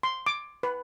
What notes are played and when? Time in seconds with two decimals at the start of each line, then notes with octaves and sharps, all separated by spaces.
0.03 C6
0.26 D6
0.63 B4